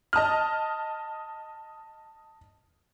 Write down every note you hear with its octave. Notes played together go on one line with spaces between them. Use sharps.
D#5 A5 D#6 F6